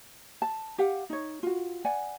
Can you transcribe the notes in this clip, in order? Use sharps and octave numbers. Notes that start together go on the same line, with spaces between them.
A5
G4 F5 F#5
D#4 C#5
F4 F#4
D5 F#5 G#5